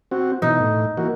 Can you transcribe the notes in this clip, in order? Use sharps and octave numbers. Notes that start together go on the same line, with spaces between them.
C4 F#4
B2 E3 D#4
A2
E3 A#3 F#4